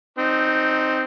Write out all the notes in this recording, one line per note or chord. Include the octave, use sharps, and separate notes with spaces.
C4 D#4